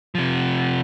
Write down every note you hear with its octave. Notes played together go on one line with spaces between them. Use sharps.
C3 F3